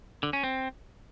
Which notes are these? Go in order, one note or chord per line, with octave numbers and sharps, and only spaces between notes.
D3
C#4
C4